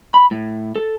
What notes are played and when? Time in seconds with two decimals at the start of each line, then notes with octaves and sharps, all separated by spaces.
0.14 B5
0.31 A2
0.76 A4